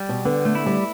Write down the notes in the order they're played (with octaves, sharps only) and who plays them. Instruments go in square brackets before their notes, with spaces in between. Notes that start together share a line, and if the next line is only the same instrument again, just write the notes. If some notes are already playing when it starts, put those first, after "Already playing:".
Already playing: [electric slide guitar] G3
[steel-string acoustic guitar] B2
[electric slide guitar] D3 [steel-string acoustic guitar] B3
[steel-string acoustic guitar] A3
[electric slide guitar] E4
[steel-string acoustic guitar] G3